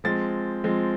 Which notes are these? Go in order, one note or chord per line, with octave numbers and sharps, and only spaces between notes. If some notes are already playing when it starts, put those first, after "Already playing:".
F3 G#3 C4 A6
F3 G#3 C4